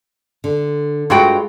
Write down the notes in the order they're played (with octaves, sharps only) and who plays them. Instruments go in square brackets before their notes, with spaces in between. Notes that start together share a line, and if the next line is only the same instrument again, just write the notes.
[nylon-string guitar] D3
[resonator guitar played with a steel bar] G2 F#4 G5 [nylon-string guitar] G#3 F4